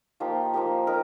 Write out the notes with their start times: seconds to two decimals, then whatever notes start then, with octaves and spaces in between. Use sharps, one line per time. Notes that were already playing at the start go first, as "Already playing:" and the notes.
0.20 F3 A#3 D#4 G4
0.54 F3 A#3 D#4 G4
0.87 D#4 A#4 D#5